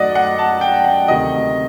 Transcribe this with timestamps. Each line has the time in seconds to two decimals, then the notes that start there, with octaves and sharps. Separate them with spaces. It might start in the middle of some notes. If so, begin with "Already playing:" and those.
Already playing: F#2 D#3 F#3 A3 D5 D#5 F#5
0.15 F#5
0.39 A5
0.61 G5
0.84 F#5
1.08 D2 C3 D#3 D#5